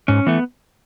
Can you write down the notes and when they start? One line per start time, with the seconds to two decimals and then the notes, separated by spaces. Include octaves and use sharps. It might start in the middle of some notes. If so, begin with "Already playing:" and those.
0.08 G#2 C#4
0.27 E3 A3 B3